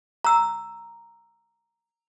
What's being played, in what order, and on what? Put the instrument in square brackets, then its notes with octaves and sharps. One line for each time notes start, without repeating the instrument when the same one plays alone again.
[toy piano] A#5 E6